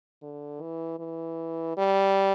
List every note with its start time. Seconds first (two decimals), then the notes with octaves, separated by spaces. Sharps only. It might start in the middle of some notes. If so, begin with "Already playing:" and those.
0.22 D3
0.61 E3
0.99 E3
1.77 G3